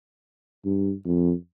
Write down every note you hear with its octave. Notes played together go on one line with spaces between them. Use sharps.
G2
F2